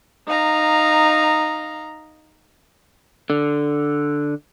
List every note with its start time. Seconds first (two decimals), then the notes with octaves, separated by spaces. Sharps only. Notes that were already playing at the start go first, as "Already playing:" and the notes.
0.25 D#4 F5 A#5
3.30 D3